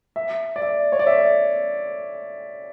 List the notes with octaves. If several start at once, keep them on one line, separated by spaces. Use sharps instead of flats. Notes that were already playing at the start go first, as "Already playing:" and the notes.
E5
D5
E5
C#5
D5
E5